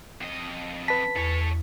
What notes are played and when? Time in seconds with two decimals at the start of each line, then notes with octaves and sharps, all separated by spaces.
0.21 F2 D#5
0.88 B4 A5 B6
1.16 E2 A4 C#5